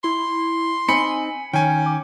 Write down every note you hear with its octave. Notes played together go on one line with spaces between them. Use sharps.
E4 C6
C4 D#4 G#5 B5 C#7
D#3 C#4 C#5 G5 G#5
D6